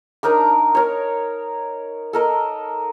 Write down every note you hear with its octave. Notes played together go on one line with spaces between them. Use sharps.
D4 D#4 A#4 D6
A#4 C#5
A4 A#4 D#5